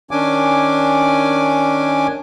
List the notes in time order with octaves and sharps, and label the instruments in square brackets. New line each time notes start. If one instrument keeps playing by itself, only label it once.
[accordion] D#3 C#4 D4 G#5 D6